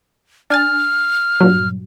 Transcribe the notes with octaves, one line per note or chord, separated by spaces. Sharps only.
D4 G#5 F6 A6
G2 A#2 F#3